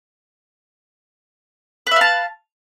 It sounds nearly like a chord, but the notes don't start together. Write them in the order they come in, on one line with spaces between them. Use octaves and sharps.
B4 E5 F5 A5